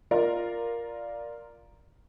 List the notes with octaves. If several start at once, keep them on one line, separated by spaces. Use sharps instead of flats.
F4 A#4 D5 F5